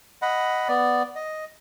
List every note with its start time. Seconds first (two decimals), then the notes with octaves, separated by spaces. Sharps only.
0.22 D#5 F#5 B5
0.68 B3 D5
1.16 D#5